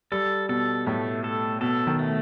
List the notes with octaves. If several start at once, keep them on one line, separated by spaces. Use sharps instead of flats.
G3 A4
B2 A4
A2 A3
A4
B2 A4
D#3
A3